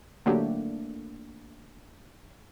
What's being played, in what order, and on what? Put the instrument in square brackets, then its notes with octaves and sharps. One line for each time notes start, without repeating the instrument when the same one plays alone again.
[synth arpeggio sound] D3 F#3 G4 [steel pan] A3 A#3 D4